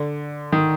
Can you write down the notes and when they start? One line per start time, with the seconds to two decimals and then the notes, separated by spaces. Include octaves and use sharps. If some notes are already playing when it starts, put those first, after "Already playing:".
Already playing: D3
0.53 D#3